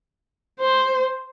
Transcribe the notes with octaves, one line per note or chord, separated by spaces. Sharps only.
C5